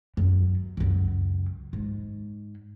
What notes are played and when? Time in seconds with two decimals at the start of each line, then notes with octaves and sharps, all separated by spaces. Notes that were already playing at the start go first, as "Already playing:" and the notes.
0.17 F#2
0.77 C#2 F#2
1.73 G#2